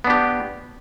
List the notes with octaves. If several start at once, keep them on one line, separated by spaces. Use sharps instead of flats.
B3 D4 G4